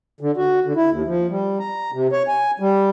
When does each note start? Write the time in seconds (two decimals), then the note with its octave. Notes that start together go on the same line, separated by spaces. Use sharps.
0.21 D3
0.37 F#4
0.65 D3
0.76 E4
0.90 D#2
1.06 F3
1.30 G3
1.60 A#5
1.93 C3
2.12 C#5
2.28 G#5
2.60 G3